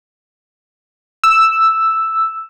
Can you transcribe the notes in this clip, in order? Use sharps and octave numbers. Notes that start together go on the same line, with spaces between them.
E6